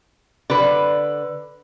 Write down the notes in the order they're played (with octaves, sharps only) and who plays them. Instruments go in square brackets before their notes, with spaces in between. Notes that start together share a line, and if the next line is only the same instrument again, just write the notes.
[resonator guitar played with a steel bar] D3 B4